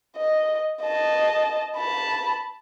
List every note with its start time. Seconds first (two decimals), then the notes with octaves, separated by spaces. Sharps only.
0.17 D#5
0.82 D#5 A5
1.77 A5 B5